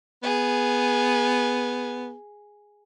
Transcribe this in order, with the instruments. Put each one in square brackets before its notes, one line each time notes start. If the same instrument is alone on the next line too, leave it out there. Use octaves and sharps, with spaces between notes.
[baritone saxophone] B3 [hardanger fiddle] G#4